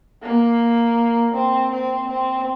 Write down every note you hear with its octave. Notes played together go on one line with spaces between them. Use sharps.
A#3
C4
C4
C4